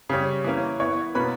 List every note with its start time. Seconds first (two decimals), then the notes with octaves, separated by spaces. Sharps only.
0.09 C#3 G3 C#4
0.44 E3 A#3 C#4
0.80 E3 B3 C#5 C#6
1.15 B2 A#3 C#4 B4 B5